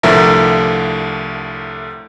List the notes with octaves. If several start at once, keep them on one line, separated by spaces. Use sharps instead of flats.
C2 A2 D3 F3 A#4 E5